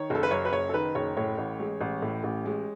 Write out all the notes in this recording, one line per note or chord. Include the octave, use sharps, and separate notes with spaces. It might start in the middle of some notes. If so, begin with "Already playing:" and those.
Already playing: D#3 C#5
F#1 A4
B4
F#2 C#5
B4
F#1 C#5
A4
D#3 B4
F#1 C#5
A2 C#5
A1
G#3
A1
A2
A1
G#3